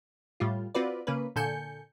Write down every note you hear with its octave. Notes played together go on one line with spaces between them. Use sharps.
A2 G3 F4
C4 F4 F#4 B4 D5
C#3 A#3 C#4 B4
A#2 D3 A4 G#5 G6 C#7